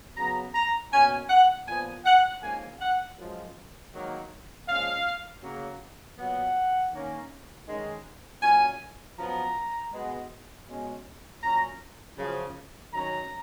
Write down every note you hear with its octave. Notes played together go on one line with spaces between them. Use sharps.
C#3 F#3 B3 A#5
A#5
B2 A#3 C#4 G#5
F#5
A#2 F3 B3 G#5
F#5
G#2 F3 A#3 C#4 G#5
F#5
F#2 F3 G#3
G#2 D#3 F#3 A#3
A#2 F3 G#3 C#4 F5
C#3 F#3 A#3
A#2 F#3 B3 F#5
D#3 A#3 C#4
D#3 G#3 C#4
A#2 F#3 C#4 G#5
F#2 F3 B3 A#5
B2 G#3 B3
B2 G#3 C#4
A#2 F#3 C#4 A#5
F#2 C#3 F3
D#3 F#3 C#4 A#5